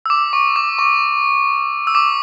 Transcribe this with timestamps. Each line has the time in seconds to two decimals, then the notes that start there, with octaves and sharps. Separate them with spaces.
0.06 E6
0.10 D6
0.33 C#6
0.56 D6
0.79 C#6
1.87 E6
1.95 D6